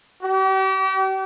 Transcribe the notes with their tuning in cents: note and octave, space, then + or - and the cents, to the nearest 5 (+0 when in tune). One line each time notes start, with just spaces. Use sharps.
G4 -40